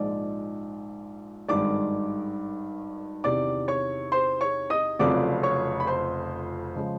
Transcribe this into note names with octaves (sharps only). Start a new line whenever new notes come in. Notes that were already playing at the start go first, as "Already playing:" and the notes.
Already playing: A#1 G#2 F3 G#3 D5
G#1 G2 D#3 G#3 D5 D6
E2 C3 D#3 D5 D6
C#5 C#6
C5 C6
C#5 C#6
D#5 D#6
F1 F2 C#3 F#3 D5 D6
C#5 C#6
B5
C5 C6
C#3 F3 G#3